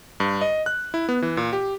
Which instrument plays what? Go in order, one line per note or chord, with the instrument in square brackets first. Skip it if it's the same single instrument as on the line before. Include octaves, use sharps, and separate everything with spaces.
[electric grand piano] G2
D#5
F#6
E4
B3
E3
A#2
G4